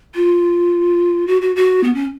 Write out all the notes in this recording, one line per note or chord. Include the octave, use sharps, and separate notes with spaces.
F4
F#4
F#4
F#4
B3
C#4